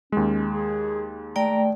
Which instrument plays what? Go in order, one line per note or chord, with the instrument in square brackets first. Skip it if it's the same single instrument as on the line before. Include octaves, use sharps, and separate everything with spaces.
[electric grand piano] D#2 G#3 [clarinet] C#4
[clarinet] G#4
[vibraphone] A3 D5 G5 [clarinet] A#5